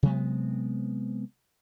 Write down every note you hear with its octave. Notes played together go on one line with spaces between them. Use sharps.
C3 F#3 G#3 B3